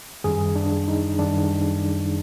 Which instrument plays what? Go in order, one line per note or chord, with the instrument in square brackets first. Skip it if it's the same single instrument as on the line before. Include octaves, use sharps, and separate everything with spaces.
[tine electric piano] F#2 D#3 G3 G#4
D4
D#4
F#2 D#3 G3 D4